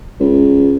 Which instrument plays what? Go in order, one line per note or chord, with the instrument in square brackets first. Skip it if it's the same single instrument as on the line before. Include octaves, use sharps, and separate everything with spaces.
[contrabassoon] C#2